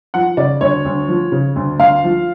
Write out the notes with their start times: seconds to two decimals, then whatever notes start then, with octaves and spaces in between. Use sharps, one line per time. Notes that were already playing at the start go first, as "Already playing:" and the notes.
0.14 F3 F#5
0.37 C#3 D5
0.61 D2 C#5
0.85 D2
1.08 F3
1.32 C#3
1.56 D2
1.79 D2 F5
2.04 F3